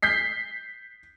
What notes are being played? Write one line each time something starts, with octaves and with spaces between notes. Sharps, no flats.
G6 B6 C7